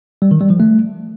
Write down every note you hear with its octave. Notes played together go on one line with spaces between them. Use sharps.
G3
D#3
G3
F3
A3